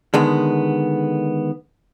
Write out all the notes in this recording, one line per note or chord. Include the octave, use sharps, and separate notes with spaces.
D3 D#3 G#3 B3